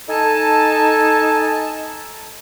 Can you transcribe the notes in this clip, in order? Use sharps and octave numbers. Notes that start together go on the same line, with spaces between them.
D#4 A4 G#5 A5